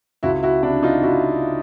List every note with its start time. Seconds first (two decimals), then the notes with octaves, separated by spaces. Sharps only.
0.23 C#2 E4 F#4
0.43 E4 F#4
0.63 C3 D4 E4
0.83 D#4 F4
1.03 C#2 E4 F#4